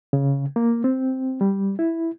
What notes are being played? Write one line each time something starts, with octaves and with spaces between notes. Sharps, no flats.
C#3
A#3
C4
G3
E4